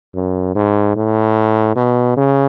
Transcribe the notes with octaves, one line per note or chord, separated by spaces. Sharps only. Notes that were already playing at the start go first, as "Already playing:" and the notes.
F#2
G#2
A2
B2
C#3